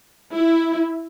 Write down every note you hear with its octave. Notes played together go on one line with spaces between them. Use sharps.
E4